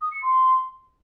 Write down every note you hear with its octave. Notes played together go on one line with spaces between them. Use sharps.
D#6
C#7
C6